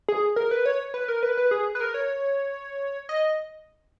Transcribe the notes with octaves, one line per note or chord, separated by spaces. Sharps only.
G#4
A#4
B4
C#5
B4
A#4
B4
B4
G#4
B4
A#4
C#5
D#5